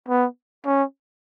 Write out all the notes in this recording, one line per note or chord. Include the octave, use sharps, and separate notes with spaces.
B3
C#4